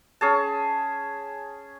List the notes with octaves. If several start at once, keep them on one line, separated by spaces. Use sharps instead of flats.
C#4 G#4 A5